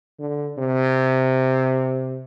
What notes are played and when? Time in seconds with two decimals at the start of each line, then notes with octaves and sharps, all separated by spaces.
0.19 D3
0.58 C3